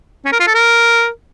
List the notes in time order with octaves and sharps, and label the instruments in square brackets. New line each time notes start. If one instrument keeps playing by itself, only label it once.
[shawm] C#4
A#4
F4
A4
A#4